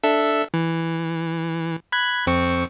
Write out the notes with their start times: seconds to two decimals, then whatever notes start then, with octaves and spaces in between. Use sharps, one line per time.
0.03 D4 A4 E5
0.54 E3
1.92 B5 F#6 G#6
2.27 F2 C4 C#6